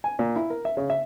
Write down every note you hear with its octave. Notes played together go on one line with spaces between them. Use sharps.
G#5
A#2
E4
A#4
E5
C#3
E5